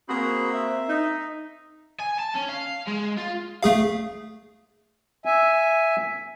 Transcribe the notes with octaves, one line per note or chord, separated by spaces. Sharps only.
A#3 C4 F#4 G#4 B5
E5
D#4
G#5
A5
C#4
F5
G#3
F4
A3 G#4 F5
E5 G#5